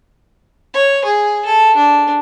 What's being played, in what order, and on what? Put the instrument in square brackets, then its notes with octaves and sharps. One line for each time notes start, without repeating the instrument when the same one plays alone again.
[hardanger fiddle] C#5
G#4
A4
D4